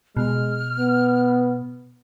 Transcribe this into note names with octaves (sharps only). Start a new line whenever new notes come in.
B2 G#3 F6
B3